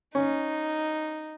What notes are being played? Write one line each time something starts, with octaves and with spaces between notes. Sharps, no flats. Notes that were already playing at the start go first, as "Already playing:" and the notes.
C#4 D#4